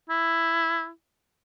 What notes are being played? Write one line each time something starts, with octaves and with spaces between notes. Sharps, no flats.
E4